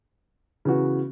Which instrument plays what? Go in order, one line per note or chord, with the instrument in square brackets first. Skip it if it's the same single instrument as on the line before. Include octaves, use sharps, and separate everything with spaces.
[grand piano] C#3 E3 B3 F#4